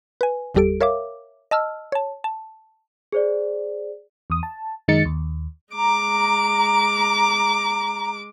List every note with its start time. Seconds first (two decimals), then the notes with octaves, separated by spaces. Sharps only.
0.21 B4 G#5
0.55 G1 E2 G3 G4 A4 D7
0.81 A#4 C#5 E5 F5 D6
1.51 D#5 A5 E6 F6
1.92 C#5 A5
2.24 A5
3.12 G#4 C5 D5
4.30 E2 D#6
4.43 A5
4.88 F#2 D#3 G#3 D#4 A6 C#7
5.05 D#2
5.74 G#3 A#5 D6